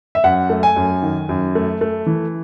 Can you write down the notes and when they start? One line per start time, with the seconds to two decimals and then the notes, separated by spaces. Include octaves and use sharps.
0.15 E5
0.24 F#2 F#5
0.50 A3
0.63 G#5
0.76 F#2
1.02 D#3
1.29 F#2
1.55 A3
1.81 A3
2.07 E3